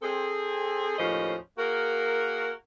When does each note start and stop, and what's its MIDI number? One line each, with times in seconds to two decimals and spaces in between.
0.02 0.95 60
0.02 0.95 68
0.02 0.95 69
0.99 1.35 39
0.99 1.35 45
0.99 1.35 53
0.99 1.35 61
0.99 1.35 72
0.99 1.35 75
1.58 2.51 58
1.58 2.51 66
1.58 2.51 68
1.58 2.51 70